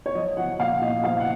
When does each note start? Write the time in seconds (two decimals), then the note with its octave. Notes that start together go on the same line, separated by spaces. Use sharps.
0.06 C#5
0.15 F3 D#5
0.37 F3 F#5
0.59 A#2 F5
0.81 A#2 D#5
1.04 F3 F5
1.20 F#5